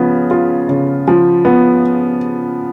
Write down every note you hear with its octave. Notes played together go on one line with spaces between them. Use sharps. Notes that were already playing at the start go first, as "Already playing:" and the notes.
Already playing: C#3 F3 B3
F4
C#3
F3
B3